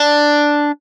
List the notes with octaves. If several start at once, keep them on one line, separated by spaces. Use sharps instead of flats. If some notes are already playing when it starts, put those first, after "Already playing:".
Already playing: D4